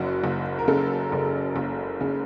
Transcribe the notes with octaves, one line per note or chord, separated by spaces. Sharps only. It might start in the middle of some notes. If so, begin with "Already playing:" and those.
Already playing: F#1 F#2 F#4
F#1
A#4
C#3 A4
F#1
F#1
C#3